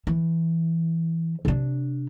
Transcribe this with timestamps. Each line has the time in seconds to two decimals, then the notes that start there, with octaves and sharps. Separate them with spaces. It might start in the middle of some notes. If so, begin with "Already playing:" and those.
0.07 E3
1.45 C3 D4